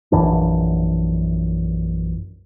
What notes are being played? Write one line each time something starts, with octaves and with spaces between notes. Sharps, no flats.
A#1 F#2 E3 D4